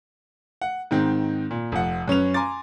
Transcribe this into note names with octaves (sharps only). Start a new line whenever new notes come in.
F#5
G#2 D#3 C4
A#2
F1 F3 F#5
F#2 C#4 B4 F7
G#5 A#5 C6 D6 A6